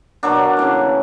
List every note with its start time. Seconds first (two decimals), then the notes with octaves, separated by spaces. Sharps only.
0.23 B2 F#3 A#3 D4
0.57 C#3 E3 A3